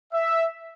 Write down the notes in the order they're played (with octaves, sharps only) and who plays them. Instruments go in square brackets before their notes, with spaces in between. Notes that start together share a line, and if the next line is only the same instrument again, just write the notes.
[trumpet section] E5